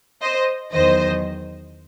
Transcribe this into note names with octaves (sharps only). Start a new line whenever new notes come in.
C5 D#5
E2 D#3 F#3 C5 D#5